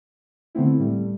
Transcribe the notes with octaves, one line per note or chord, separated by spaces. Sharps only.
D3 A3 B3 C4 E4
A2 G3 A3